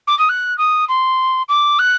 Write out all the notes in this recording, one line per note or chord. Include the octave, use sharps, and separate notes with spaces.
D6
D#6
F#6
D#6
C6
D6
F#6